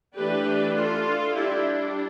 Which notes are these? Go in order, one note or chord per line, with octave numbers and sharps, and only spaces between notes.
E3 A3 D4 G4 B4
F4 A4
G3 D4 E4 G4